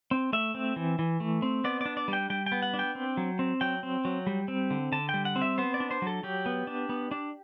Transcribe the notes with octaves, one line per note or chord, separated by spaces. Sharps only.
C4
A3 E5
C4
E3
E3
A3
C4
B3 D5
D4 D5
D5
G3
G5
G3 G5
G5
B3
F#5
D4
G5
C4
F#3
C4
F#3 G5
C4
F#3
G3
C4
D3
D3 A5
G5
G3
F#5
C4
E5
B3 C5
D5
D4
C5
F#3 A4
F#3 G4
B3
D4
B3
D4